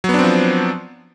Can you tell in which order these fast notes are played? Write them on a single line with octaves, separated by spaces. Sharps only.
F#3 B3 D4 C4 F3